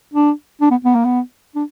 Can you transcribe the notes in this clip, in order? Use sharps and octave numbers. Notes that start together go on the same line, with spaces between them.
D4
D4
B3
B3
A#3
B3
D4